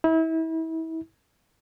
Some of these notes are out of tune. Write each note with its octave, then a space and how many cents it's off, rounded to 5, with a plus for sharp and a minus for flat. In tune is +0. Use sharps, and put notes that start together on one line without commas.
E4 -35